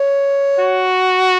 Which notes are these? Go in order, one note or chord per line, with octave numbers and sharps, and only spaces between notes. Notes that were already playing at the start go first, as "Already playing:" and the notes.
Already playing: C#5
F#4